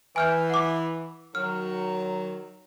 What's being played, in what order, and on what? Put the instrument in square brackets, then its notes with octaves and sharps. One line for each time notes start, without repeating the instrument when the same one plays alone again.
[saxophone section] E3 [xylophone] G#5 F6 G6
[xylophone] F#5 D6
[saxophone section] D#3 F#3 [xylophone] F6